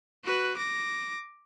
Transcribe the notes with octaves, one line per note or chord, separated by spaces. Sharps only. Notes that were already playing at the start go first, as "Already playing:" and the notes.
F#4 B4
D6 A#6